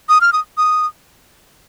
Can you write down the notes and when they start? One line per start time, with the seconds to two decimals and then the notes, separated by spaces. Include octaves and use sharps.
0.09 D#6
0.21 F6
0.33 D#6
0.57 D#6